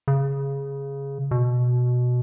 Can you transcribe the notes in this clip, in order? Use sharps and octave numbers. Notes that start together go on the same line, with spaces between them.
C#3
B2